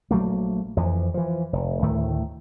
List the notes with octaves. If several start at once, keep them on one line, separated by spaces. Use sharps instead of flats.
A#1 F#3 A3 A#3
F2 E3 F3
E3 F3
F1
D2 A2 D#3 A3